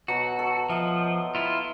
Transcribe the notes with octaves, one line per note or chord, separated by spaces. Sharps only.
B2 F#3 F#4
A4
F3 D#5 E5
E4 F4